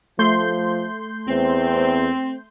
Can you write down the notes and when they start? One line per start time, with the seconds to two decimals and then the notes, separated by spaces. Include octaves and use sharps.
0.19 F3 A3 C6 G6
1.28 E2 C4